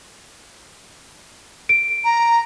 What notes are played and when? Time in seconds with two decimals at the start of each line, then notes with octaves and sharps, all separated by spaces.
1.69 D7
2.04 A#5